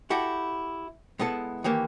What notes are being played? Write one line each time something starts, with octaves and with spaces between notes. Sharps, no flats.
E4 F#4 G4 A4
G#3 B3 E4 A4
D#3 E3 A#3 G4